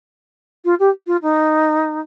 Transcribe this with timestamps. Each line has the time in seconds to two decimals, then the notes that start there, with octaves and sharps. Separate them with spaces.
0.65 F4
0.80 G4
1.07 F4
1.22 D#4